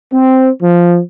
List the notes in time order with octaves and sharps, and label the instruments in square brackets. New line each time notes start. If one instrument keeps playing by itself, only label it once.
[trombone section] C4
F3